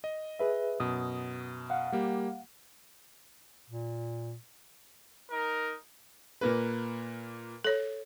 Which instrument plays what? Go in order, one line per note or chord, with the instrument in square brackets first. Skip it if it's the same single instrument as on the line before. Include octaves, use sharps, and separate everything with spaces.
[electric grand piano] D#5
[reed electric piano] G#4 B4 E5
[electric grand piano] F#2 B2 [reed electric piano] D#6
[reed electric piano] F5 F#5
[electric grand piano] G3 A#3 G4
[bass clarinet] A#2
[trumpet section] D#4 A#4
[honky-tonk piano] A#2 A#3 B4
[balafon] A4 C#5